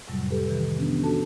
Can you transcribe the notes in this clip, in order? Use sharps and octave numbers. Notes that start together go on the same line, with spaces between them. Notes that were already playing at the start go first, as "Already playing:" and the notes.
F2 A2 C3 F#3 G3
G4 A4 B4
C3 D#3 E3
F3 B3 C#4 D4
D4 F#4 A4 A5